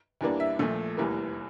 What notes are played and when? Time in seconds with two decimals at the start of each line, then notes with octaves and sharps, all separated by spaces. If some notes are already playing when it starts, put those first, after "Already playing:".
0.21 E2 E3 G3 A#3 D4
0.40 E5
0.59 A#1 A#2 F3 A3
0.97 F1 E2 E3 G3 A#3